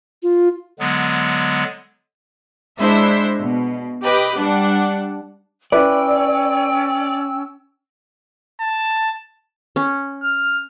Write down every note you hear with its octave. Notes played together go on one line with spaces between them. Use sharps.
F4
D3 F#3 G#3 B3
G#3 D4 E4 C5 E5
B2
G4 B4 D#5 D6
G3 D4 F#5
C#4 E4 B4 D5 G5 E6
A5
C#4 C#5
F6